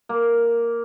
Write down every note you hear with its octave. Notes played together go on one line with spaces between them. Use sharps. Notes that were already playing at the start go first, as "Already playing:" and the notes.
A#3